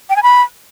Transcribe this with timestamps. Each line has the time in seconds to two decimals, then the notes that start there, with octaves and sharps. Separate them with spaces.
0.10 G5
0.16 G#5
0.23 B5